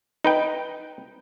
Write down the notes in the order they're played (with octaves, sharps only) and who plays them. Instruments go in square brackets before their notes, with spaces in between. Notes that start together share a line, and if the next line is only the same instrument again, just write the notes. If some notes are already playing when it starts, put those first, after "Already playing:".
[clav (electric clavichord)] D#4 B4 G5